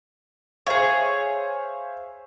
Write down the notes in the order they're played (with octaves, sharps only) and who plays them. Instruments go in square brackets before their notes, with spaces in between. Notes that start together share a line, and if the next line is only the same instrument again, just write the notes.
[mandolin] G#4 C#5 [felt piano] C5 E5 F5